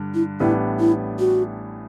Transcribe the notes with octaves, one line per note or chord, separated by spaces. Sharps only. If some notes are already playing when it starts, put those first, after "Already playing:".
Already playing: G2 D3
E4
A1 A2 G3 B3 D4 E4
E4
F#4